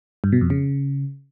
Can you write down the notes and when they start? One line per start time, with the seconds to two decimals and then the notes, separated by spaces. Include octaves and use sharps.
0.24 G2
0.33 B2
0.41 F2
0.50 C#3